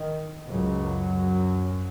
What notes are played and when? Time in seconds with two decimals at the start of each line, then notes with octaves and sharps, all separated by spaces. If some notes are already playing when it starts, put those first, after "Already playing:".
Already playing: D#3
0.48 C#2 F#2 C#3 F#3